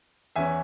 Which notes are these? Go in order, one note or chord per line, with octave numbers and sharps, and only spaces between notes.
E2 E3 C#4 E4 E5 G#5